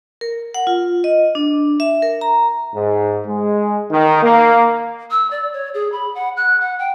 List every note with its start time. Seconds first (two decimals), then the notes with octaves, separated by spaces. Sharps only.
0.21 A#4
0.54 F#5
0.67 F4
1.04 D#5
1.35 D4
1.80 E5
2.02 A#4
2.21 A#5
2.74 G#2
3.26 G#3
3.91 D#3
4.23 A#3
5.11 E6
5.31 D5
5.53 C#5
5.74 G#4
5.92 B5
6.15 F#5
6.37 F#6
6.61 F#5
6.79 G5